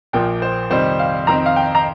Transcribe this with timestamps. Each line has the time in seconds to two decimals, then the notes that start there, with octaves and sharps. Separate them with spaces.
0.13 A#1 A#2 F3 A#3 G5
0.42 C5
0.71 F2 C3 D#3 G3 C5
0.99 F5
1.27 F2 D#3 C4 A#5
1.46 F5
1.56 G5
1.75 A#5